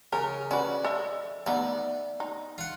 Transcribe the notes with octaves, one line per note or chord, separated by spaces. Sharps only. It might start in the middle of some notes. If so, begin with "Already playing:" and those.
C#3 A#4
C#4 F#4 B4 D5
A4 D#5 E5
A3 B3 D#4 D5
D#4
F4 F#5